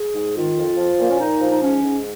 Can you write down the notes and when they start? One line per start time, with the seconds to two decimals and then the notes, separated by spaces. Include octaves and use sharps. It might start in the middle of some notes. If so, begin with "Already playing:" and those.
Already playing: G#4
0.15 G#2
0.36 D#3 F4
0.57 F2
0.77 F3
0.99 A#2 A#3
1.10 C#4
1.19 A#2 D#4
1.41 F3
1.50 D#4
1.61 G#2 C#4
1.82 G#2